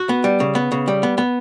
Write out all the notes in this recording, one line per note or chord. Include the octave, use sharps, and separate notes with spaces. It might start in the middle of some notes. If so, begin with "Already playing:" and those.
Already playing: F#4
B3
G3
C#3
B3
C#3
G3
B3
B3